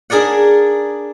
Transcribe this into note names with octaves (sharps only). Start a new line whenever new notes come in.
D4 G#4 A#4 D5 F#5